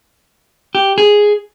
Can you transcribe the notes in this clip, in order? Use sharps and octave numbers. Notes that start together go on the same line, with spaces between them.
G4
G#4